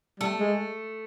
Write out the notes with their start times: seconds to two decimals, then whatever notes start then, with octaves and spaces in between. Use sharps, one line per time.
0.20 G3 A3
0.40 G#3